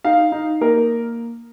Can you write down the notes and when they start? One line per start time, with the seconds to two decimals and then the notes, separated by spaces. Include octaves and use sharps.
0.04 D#4 F5
0.32 D#4
0.61 A#3 A#4